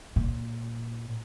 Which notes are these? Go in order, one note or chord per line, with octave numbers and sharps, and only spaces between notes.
A#2